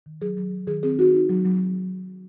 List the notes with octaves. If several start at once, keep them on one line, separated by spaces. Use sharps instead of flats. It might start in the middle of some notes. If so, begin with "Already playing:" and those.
D#3
F#3 G#4
F#3
F#3
D#3 G#4
C4 G#4
D#4 F#4
D#4
F#3
F#3